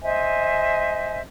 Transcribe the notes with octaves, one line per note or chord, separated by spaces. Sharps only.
C5 D#5 E5 G#5